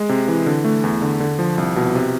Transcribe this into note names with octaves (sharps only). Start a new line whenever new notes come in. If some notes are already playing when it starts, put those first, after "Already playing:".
Already playing: G#3
C3
E3
D3
A3
E2
D3
D3
F3
C2
B2
C3